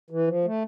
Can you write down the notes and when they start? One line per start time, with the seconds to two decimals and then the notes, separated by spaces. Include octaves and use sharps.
0.10 E3
0.27 F3
0.45 A3